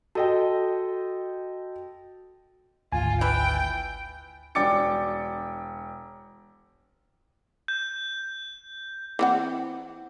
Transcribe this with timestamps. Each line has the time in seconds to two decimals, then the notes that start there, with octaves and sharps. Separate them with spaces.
0.15 F#4 A4 D#5 G5
2.92 G#1 D2 F4 G#5
3.21 E3 B4 G5
4.55 E1 D4 G5 D6 A6 C#7
7.68 G6
9.19 E3 C4 F#5